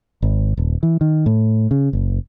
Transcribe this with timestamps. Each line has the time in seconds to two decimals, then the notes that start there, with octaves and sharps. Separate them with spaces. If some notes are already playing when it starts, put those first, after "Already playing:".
0.22 G#1
0.57 D#1
0.83 E3
1.01 D#3
1.26 A2
1.71 C#3
1.93 F#1